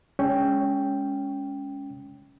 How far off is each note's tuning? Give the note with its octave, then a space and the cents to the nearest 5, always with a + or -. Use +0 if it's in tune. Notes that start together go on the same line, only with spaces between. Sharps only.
G#3 -5 C#4 +10 G5 +0